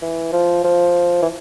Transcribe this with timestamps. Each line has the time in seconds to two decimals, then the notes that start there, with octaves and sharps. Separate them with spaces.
0.02 E3
0.32 F3
0.64 F3
1.22 E3